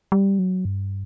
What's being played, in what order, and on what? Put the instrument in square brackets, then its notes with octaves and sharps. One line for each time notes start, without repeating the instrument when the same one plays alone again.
[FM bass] G3
F#3
G2